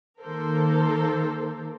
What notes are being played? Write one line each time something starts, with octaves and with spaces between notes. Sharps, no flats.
D#3 A#3 A4 A#4 C5